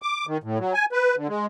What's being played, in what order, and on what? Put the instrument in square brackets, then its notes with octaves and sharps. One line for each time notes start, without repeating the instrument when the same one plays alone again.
[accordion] D6
D#3
A2
F#3
G#5
B4
D3
G#3